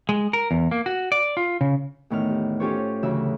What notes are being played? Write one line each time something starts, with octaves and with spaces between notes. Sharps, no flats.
G#3
A#4
E2
A#3
F#4
D5
F4
C#3
E2 A2 D#3 F6
G4
C#4 F4 G4 A4 C5 C#5
D2 C#3 E3 F#3 E5 E6